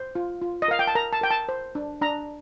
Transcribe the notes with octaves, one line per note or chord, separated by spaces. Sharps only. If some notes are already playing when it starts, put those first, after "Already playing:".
Already playing: C5
F4
F4
D#5
A#4 F5
G5
A5
A#4 A#5
A5
A#4 G5
A5
C5
D4
D4 A#5